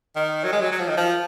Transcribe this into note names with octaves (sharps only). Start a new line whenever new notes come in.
D#3
F#3
G#3
F#3
F#3
F3
D#3
F3